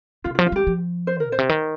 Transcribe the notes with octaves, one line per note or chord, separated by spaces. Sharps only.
C3 F4
F4
F3
F4
G3 G4
F3
C5
A#4
A#2 C5
C3
D#3